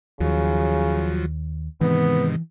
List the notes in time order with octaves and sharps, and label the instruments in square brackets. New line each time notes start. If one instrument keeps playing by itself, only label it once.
[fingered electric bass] D#2 [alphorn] C#3 [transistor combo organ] F3 F#3
[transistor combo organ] G#2 C3 D#3 [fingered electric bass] E3 [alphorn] B3